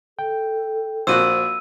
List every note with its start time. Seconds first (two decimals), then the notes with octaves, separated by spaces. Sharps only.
0.19 A4 G5
1.07 A#1 F#4 C5 E6 F#6 D#7